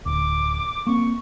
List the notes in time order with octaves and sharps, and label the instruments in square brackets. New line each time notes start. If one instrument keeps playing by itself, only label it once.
[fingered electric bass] D1 [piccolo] D6
[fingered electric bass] A#3 C4 [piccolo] C#6